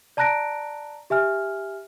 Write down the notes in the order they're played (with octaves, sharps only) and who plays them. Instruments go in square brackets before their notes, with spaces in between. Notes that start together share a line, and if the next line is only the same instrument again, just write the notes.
[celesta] D5 A5 A#5 F#6 A#6 D7
G4 E5 G#5 F6